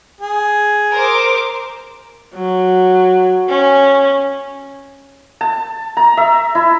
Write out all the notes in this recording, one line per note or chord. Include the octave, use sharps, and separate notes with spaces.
G#4
A#4 C5 D6
F#3
C#4
A5
A#5
E5
E4